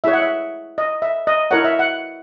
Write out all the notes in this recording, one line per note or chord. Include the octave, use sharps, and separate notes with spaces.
E4 G#4 C#5 E5
F#5
E5
D#5
E5
D#5
E4 A#4 C#5 F#5
E5
F#5